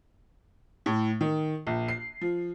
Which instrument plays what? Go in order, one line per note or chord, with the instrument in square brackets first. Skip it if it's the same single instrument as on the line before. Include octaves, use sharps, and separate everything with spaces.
[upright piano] A2
D#3
A#1
C7
F3